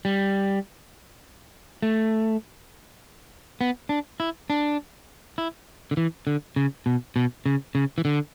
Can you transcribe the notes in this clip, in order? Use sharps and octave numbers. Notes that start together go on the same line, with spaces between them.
G3
A3
B3
D4
E4
D4
E4
D3
E3
D3
C#3
B2
B2
C#3
C#3
E3
D3